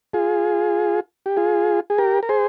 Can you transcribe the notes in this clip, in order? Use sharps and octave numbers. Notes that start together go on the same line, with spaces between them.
F4 G#4
G4
F4 G#4
G#4
G4 A#4
A#4
G#4 C5